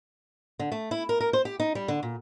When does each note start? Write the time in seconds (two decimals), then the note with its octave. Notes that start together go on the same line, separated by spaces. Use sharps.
0.59 D3
0.72 A3
0.91 E4
1.09 A#4
1.20 A#4
1.33 C5
1.45 G4
1.60 D#4
1.75 G3
1.88 D3
2.03 A#2